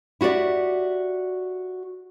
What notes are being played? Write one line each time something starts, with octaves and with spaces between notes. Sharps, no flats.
E4 F#4 G4 D5 E5